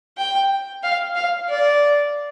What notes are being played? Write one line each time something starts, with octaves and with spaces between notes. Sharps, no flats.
G5
F5
F5
D5